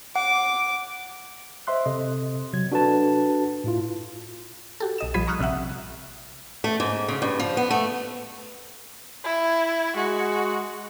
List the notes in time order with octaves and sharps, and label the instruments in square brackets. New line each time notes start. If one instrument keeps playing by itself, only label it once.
[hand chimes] F#5 [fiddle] D6
[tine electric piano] C5 D#5 E5 C6 F#6
C3 A4 D#5
C3 F#3 G#6
D4 F#4 A4 B4 A5
A2 E4 F4
[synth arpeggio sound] F#4 G4 A4
B1 D#5 E7
A#1 F3 G3 B5 G#6 D#7
A#5 C#6 D#6 F6 F#6
A#1 C3 C4 E5 F#5
[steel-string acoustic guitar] A3
G#2
C#3
G2
F3
B3
A3
[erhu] E4
[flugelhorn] G#3 [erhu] F#4